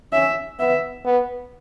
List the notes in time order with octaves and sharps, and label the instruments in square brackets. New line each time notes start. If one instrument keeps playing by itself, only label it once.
[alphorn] C#4 [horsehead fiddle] E5
[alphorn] B3 [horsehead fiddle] E5
[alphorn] B3